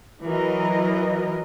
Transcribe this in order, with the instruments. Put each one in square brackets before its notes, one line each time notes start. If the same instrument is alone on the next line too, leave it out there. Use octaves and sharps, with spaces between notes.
[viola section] E3 F#3 A#4 D#5